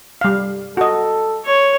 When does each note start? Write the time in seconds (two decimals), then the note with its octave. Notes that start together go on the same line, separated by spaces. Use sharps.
0.21 G3 F5
0.77 F#4 A4 D#5
1.45 C#5